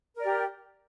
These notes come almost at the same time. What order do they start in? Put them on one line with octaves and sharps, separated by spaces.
A#4 D5 G4